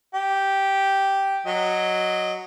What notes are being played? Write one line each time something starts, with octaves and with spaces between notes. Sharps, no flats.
G4
F#3 D#5